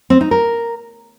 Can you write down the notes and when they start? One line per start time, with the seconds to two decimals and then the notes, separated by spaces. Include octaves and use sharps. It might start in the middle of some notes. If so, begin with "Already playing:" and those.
0.10 C4
0.21 D#4
0.31 A#4